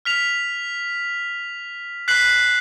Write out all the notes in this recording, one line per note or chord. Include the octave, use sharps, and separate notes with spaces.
F6 B6 F7
F#6 B6 C7 F#7